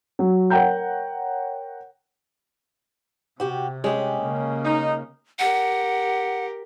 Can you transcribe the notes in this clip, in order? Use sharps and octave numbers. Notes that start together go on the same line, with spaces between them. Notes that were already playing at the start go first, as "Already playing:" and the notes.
F#3
A#4 C#5 F#5 G5 A#5 G6
C3 F#4 G4
G#3 C#4 G4
C#3 A#3
D#4
G4 A#4 F#5